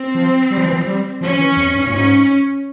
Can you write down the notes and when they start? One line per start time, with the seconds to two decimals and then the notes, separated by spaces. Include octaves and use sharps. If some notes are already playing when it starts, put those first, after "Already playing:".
Already playing: C4
0.15 F3
0.51 G3
0.58 F3
0.66 E3
0.73 F3
0.86 G3
1.21 F3 C#4
1.39 E3
1.57 F2
1.75 G2
1.87 A#2
1.92 G#2 C#4